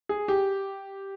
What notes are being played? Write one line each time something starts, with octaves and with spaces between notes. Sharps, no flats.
G#4
G4